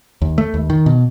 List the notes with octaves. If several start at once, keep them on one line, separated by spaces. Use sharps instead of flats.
D#2
A3
D#2
D#3
B2